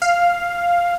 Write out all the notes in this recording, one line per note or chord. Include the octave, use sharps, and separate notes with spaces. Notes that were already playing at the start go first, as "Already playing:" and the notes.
F5